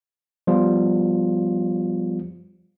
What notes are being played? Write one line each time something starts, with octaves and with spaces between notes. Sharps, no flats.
F3 G3 B3 F4